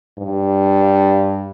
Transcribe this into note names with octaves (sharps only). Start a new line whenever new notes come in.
G2